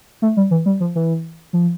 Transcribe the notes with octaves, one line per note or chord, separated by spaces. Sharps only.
A3
G3
E3
G3
F3
E3
F3